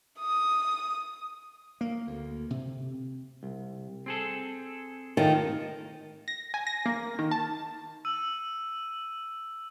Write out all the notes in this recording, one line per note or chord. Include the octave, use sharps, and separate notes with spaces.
D#6
A#3
D2
C3
C2
C4 G#4 A4
A2 D#3 F4 A4
A#6
G#5
A#6
A#3
D#3
A5
E6 D#7 F#7